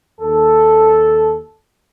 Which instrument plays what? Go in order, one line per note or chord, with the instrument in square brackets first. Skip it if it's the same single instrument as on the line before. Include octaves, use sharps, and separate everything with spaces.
[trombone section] D#2 A4